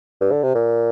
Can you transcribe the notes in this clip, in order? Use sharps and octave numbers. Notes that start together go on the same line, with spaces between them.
G2
D3
C3
A#2